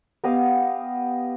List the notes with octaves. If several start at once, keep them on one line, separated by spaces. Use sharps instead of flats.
B3 G4 D#5 F5